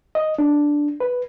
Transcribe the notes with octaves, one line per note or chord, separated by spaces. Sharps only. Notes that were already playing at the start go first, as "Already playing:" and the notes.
D#5
D4
B4